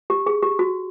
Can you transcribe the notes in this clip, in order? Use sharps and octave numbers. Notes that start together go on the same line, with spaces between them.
G4
G#4
G4
F#4